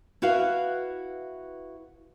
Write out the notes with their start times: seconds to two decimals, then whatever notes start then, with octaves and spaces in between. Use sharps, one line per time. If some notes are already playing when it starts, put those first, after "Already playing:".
0.22 E4 F#4 B4 E5 F5